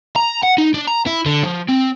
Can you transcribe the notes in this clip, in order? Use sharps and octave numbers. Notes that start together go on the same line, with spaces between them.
A#5
F#5
D#4
D4
A#5
E4
D3
F3
C4